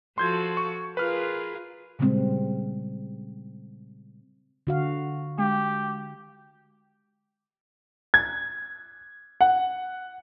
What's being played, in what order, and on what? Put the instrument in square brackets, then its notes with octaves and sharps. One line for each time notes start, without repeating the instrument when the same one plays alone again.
[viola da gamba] F3 F#4 A4 [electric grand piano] C6 G6 G#6
[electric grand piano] C#6
[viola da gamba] F4 G#4 A#4 [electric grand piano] B4 F6
[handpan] A#2 C#3 G3 G#3 C4
D3 F#4 F5
[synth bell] G#3 [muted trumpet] G4
[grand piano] G#6
F#5